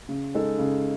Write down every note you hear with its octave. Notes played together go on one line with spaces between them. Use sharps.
C#3
G#3 D#4 A4
C#3